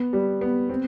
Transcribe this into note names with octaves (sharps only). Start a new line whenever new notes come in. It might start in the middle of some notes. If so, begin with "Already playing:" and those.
Already playing: B3
G3
B3
C4